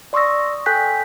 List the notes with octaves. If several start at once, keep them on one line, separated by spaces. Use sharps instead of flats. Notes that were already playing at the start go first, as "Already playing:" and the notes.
D5 C6 C#6 D#6 E6 A#6
A4 G5 G#5 F#6 G6 B6